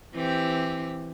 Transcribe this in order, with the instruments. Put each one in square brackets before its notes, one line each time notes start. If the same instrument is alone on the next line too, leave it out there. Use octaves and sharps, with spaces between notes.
[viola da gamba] E3 C4 G4